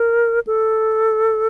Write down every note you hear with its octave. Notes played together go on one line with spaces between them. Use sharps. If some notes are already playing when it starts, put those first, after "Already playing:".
Already playing: A#4
A4